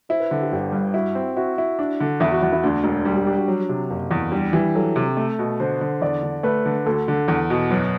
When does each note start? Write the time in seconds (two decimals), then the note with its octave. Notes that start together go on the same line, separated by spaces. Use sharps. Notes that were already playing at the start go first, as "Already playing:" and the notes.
0.09 E4 C5
0.20 B4
0.31 D3
0.41 G4
0.52 G1 G4
0.72 G2
0.94 E4 F#4
1.15 C4
1.36 E4 F#4
1.58 E4
1.79 D4
2.00 D3
2.20 E2 E4
2.31 F#4
2.42 E2 F#4
2.52 E4
2.63 D2 D4
2.84 E1
3.05 G3
3.16 G4
3.27 D4 G4
3.37 F#4
3.48 F#3
3.69 C3
3.90 F#1
4.11 E2
4.32 G3 D4
4.53 E3 G4
4.75 F#3 A4
4.96 C3
5.17 A3
5.39 B2
5.60 D3 C5
5.81 D3
6.01 E2 D5
6.23 D3
6.43 A3 B4
6.65 D3
6.86 D2 A4
7.08 D3
7.28 E2
7.50 B2
7.70 F#2 B4